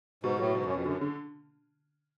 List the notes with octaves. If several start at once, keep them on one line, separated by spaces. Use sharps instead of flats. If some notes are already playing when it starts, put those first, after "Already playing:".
G#2 B2
A2 F#3
G#2 B2
F#2
F2 C#4
F#2 D3
D3